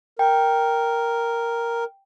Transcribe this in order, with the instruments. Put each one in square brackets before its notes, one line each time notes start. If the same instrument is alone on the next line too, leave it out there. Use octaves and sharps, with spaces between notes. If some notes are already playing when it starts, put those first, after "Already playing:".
[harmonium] A#4 [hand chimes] G5